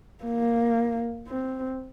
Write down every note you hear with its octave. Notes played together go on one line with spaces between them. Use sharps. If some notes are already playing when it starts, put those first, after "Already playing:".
A#3
C4